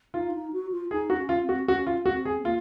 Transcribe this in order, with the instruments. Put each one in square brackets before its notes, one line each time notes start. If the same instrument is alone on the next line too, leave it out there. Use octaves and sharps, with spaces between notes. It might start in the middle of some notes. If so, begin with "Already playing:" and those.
[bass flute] D#4 [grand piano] F4
[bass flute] D#4
F#4
F4
[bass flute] D#4 [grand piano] G#4
[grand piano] F#4
[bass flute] C#4
[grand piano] F4
[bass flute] C4
[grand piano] F#4
[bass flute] C#4 [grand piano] F#4
[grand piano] F4
[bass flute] C4 [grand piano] F#4
[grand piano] G#4
[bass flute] C4
[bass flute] A#3 [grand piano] F4